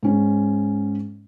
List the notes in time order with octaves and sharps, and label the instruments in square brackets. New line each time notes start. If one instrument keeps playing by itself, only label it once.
[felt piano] G#2 C#4